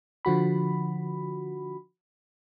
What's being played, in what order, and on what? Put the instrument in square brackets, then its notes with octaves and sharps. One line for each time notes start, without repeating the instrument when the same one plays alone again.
[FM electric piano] D3 F3 F#4 B5